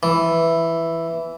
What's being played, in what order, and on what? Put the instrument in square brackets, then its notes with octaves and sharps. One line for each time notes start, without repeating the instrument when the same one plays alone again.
[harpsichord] E3